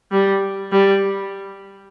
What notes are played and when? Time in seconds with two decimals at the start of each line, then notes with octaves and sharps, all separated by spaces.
0.11 G3
0.72 G3